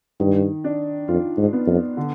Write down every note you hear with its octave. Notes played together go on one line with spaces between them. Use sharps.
G2 D#3
D4
F2 F4
G#2
B3
F2
D3